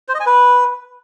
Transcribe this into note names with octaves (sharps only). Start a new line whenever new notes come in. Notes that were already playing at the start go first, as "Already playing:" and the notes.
C5
D#5
G#5
B4